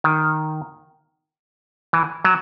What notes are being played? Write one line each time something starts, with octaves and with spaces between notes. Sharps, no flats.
D#3
E3
F#3